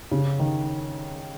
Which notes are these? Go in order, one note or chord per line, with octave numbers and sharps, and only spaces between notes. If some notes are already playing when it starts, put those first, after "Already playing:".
C#3
D#3